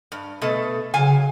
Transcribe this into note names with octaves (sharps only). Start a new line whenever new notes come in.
G2
B2 A3
C#3 F#3 F5 G#5